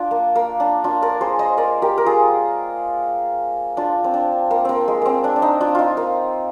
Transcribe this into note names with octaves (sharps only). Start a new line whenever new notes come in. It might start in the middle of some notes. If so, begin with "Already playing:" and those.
Already playing: D4 F4
A#3
A#3
D4
D4 F4
A#4 D5
G#4 C5
C5 D#5
A#4 D5
G4 A#4
A#4
F4 G#4
D4 F4
C4
D4
A#3
A#3 C4
G#3
A#3 C4
D4
D4
D#4
D4 F4
D#4 F4
A#3